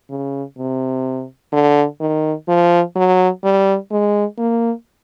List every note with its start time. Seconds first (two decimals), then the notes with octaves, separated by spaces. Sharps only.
0.10 C#3
0.58 C3
1.53 D3
2.00 D#3
2.48 F3
2.96 F#3
3.44 G3
3.92 G#3
4.38 A#3